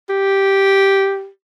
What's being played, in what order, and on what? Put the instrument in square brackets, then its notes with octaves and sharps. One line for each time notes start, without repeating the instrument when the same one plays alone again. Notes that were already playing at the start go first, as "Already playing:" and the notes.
[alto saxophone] G4